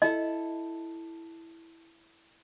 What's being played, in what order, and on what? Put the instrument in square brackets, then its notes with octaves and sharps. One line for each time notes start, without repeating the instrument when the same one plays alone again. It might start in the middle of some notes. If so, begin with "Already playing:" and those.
[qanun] E4 A4 [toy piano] D#5